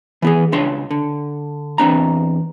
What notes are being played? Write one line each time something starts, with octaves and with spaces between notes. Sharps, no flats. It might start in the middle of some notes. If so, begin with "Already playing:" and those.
E3 B3 G#4
C#2 D4 C#5 C6
D3
E2 C4 D4 A#5